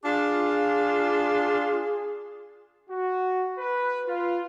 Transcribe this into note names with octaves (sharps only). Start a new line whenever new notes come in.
D4 F4 G#4
F#4
B4
F4